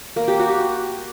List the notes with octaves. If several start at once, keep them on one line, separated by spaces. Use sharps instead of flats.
A#3
G4
F#4